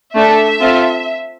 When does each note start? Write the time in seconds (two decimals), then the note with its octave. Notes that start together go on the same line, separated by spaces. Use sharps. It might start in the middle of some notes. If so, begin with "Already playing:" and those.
0.14 A3 D4 A4 E5
0.60 C4 F4 A4